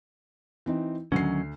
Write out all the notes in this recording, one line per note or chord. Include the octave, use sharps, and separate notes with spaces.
E3 C4 D#4
D2 D#3 F#3 C#4 C7